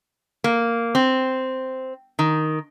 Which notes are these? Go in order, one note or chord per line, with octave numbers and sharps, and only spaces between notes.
A#3
C4
D#3